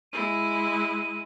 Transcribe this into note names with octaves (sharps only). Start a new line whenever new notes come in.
G#3 E4 D#7